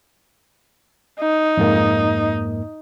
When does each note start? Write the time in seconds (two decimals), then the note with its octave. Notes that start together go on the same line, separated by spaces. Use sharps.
1.21 D#4
1.57 F2 G#2 A#3